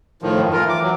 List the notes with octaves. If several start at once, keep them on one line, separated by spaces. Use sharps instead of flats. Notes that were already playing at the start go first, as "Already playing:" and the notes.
A2 D#3 F3
F#2
E3 F4 A#4
D6
F#3